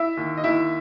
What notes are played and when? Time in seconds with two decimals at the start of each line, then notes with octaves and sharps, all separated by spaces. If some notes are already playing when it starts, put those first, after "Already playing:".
Already playing: E4 E5
0.17 D#2
0.37 D#5
0.44 D#2 E4 E5